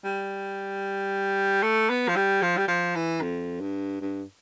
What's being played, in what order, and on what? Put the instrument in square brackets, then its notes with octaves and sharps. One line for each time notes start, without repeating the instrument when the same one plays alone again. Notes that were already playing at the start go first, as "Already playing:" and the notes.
[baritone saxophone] G3
A3
B3
F3
G3
F3
G3
F3
E3
F2
G2
G2